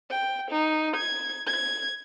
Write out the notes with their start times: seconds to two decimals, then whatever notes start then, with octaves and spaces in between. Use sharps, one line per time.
0.11 G5
0.51 D#4
0.97 G#6
1.47 G#6